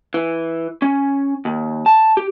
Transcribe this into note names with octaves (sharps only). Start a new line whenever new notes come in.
E3
C#4
D#2
A5
G4